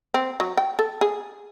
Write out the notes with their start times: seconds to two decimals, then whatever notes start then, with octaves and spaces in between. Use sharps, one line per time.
0.14 C4
0.40 F#3
0.57 G5
0.79 A4
1.01 G#4